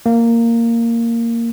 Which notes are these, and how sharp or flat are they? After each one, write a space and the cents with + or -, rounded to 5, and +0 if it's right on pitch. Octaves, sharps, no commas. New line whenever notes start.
A#3 -10